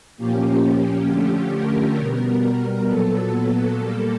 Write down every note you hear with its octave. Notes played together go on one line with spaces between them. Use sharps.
A#2 F3 A#3 C#4 G4
D3 F3 A3 C#4
A#4
B2 G3 B3
A#4
A#2 F#3 B3 A4
A4
A#2 G3 A#3 A4